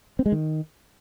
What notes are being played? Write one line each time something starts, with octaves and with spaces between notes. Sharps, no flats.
C4
G#3
D#3